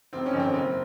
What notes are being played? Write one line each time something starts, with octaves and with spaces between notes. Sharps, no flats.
F1 C4
C#4
F2 D#3
C4
F#1 C4